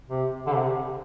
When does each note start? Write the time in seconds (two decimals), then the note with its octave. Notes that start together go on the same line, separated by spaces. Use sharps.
0.10 C3
0.46 D3
0.54 C3